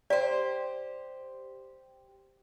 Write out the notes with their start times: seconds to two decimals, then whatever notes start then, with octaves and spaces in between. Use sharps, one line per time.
0.10 G4 C5 D5